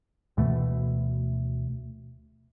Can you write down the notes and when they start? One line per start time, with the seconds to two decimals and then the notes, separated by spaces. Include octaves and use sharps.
0.37 D2 B2 E3 A3